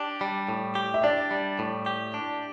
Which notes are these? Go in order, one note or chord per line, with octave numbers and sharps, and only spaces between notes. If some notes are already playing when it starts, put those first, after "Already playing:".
Already playing: D4 G4
G3
A2
G4
E5
D4 D5
G3
A2
G4
D4